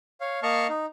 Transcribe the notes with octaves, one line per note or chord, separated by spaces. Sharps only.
C#5 F5
A#3 D#5 F5 A5 C#6 F6
D#4